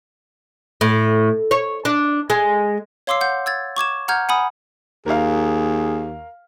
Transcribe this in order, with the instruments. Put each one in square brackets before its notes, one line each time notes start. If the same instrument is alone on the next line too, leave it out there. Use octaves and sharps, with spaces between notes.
[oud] A2
C#5
D4
G#3
[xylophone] C#5 F5 C6 D6 E6 C7
F#5 G6
E6 G#6 A6
C#6 D6 G#6 E7
F#5 A#5 F6 G6 G#6
F#5 G#5 B5 D#6
[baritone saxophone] D#2 [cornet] G#4 [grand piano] A#4 F5